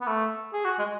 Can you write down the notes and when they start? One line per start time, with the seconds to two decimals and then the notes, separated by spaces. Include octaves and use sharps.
0.01 B3
0.07 A3
0.53 G#4
0.64 F#4
0.79 G#3